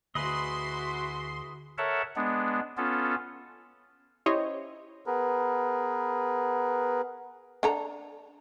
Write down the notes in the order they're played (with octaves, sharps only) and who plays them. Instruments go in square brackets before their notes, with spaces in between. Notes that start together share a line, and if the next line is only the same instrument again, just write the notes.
[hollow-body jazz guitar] D2 [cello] E4 F#4 [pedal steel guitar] G#4 B4 D#5 [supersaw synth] C6
[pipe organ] A4 A#4 C#5 E5 F#5 A5
G#3 B3 D4
B3 C#4 F4 A4
[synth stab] C#4 E4 G4 C5 C#5 D#5
[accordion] B3 G#4 A#4 B4
[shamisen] D4 A4 A#5